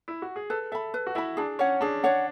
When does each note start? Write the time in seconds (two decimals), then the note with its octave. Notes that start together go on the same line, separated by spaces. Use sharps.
0.08 E4
0.22 F#4
0.36 G#4
0.50 A4 B4
0.72 A4 E5 B5
0.94 B4
1.07 F#4
1.15 E4 E5 B5
1.37 D4 G#4
1.59 C#4 C#5 F#5
1.81 D4 G#4
2.04 D4 C#5 F#5